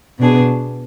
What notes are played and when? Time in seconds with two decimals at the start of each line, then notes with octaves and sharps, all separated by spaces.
0.19 B2 B3 D4 G#4